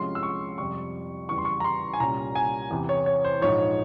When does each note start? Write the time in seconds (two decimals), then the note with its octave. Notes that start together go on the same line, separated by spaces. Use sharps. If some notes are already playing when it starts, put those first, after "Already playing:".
Already playing: C2 C3 F3 G#3 C#4 C6
0.15 E6
0.23 C#6
0.58 F2 C3 G3 C#6
1.29 E2 C#3 E3 G3 C#6
1.38 C6
1.45 C#6
1.60 A#5
1.64 C6
1.93 G#5
2.00 C2 A#2 G3 C#4 A#5
2.35 G#5
2.70 E2 C3 E3
2.89 C#5
3.06 C#5
3.24 C5
3.42 A#1 G#2 F3 C#5